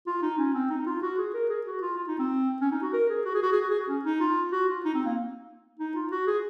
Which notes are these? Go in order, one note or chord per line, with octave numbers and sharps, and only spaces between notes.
F4
D#4
C#4
C4
D#4
D#4
F4
F#4
G#4
A#4
G#4
F#4
F4
F4
D#4
C4
C#4
D#4
F#4
A#4
G#4
F#4
G#4
F#4
G#4
F#4
G#4
F#4
C#4
D#4
F4
F#4
F4
D#4
C4
A#3
D#4
F4
F#4
G#4